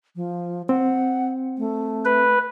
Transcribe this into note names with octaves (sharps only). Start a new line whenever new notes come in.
F3
C4 F#5
A3
B4